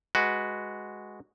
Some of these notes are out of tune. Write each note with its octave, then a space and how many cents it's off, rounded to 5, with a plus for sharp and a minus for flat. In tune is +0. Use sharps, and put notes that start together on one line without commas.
G#3 +0 F#4 +0 B4 +0